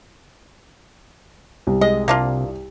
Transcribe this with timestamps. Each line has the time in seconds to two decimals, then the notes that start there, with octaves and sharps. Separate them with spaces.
1.67 C2
1.81 G#3 D#5
2.08 C3 A#3 D4 F4